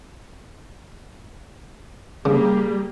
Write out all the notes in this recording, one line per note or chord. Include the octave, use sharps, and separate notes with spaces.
C#3 G3 A#3 G4 G#4